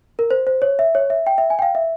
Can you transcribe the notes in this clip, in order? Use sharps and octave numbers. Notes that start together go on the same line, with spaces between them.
A#4
C5
C5
C#5
E5
C#5
E5
G5
E5
G#5
G5
F5
E5